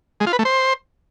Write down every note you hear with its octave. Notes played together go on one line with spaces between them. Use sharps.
G#3
F4
B4
A3
C5